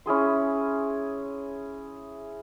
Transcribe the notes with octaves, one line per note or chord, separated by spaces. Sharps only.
C#4 E4 G#4 C6